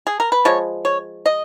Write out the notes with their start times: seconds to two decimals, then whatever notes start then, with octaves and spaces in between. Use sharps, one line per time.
0.07 G#4
0.20 A#4
0.32 B4
0.45 F3 G#3 C#5
0.85 C#5
1.26 D#5